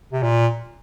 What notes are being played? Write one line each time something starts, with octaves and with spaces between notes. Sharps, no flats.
C3
A#2